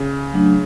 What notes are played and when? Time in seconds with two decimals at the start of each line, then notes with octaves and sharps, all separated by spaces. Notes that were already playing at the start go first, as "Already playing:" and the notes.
Already playing: C#3
0.33 F#3 A3 D4